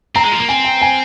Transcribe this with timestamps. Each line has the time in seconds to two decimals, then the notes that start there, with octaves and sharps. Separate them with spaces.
0.15 C4 A#5
0.24 G#3
0.31 F3
0.40 A#3
0.49 C4 G#5
0.65 G5
0.82 G#5